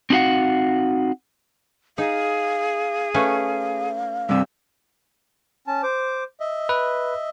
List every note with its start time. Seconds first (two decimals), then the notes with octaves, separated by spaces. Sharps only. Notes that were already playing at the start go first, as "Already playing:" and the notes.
0.10 C4 D#4 F#4 F5 F#5
1.98 D#4 G#4 F5
3.14 A3 C#4 B4 F5
4.29 G2 C3 E6
5.67 C#4 A5
5.83 C5 D6
6.40 D#5 E5
6.69 B4